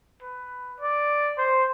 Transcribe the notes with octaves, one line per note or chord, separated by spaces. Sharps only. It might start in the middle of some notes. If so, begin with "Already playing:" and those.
B4
D5
C5